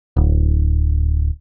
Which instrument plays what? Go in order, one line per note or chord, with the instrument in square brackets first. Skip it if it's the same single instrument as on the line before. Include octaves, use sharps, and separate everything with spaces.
[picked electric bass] D1